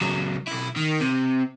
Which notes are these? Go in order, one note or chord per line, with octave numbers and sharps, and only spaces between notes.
C#2 F#3
B1 E4
D#3
C3